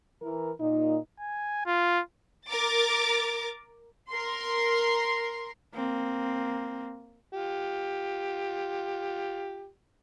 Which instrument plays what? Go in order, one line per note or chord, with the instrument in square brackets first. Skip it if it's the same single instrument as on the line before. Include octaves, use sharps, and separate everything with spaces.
[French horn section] E3 A#4
A#2 D#4
[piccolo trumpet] G#5
F4
[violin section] A#4 D6 A6
[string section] A#4 C6
[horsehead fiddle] A#3 C4
[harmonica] F4 G4